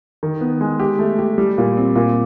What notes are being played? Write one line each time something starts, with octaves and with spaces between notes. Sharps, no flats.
D#3
B3
G#3
G4
A3
G4
G3
A#2
C4
A#2